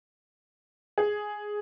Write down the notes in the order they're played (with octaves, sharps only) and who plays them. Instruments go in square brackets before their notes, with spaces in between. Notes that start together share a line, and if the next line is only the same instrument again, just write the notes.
[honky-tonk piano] G#4